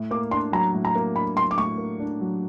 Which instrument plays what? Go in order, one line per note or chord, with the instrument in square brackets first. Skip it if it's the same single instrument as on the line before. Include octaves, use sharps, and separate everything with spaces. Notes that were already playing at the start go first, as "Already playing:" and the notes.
Already playing: [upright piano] A2
[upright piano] A#3 [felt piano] D6
[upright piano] D4 [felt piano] C6
[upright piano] F#3 [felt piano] A#5
[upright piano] A2
[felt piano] A#5
[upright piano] A#3
[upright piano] D4 [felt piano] B5
[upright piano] F#3 [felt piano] C6
[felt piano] D6
[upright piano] A2 [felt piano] C#6
[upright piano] A#3
D4
F#3